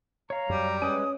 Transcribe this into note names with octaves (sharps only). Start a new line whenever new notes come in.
C#5 F5 A#5
F#2 G3
G#3 C#4 B4 G#5 D#6